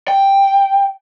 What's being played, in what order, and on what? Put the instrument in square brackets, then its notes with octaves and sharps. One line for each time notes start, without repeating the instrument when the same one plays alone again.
[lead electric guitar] G5